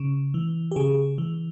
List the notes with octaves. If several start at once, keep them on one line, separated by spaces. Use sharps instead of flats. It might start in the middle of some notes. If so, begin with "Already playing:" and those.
Already playing: C#3
E3
G4
C#3 G#4
E3